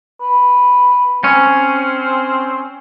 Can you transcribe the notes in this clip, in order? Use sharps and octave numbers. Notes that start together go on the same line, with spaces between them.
B4
C4 C#4